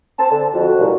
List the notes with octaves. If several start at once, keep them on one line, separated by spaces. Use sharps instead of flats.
C4 A5
D3
F2 F#4
C2 G2 A#2